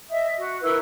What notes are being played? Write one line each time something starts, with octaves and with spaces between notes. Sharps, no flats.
D#5 E5 D#6
F#4
E4 A#4 B4